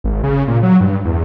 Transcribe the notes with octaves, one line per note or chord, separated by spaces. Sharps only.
G#1
C#3
A#2
F#3
G2
E2